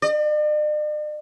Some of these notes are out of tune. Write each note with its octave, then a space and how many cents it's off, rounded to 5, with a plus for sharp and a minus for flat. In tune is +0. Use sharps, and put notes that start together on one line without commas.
D5 +45